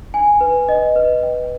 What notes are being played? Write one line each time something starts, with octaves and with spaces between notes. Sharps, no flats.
G#5
B4
D#5
B4
G5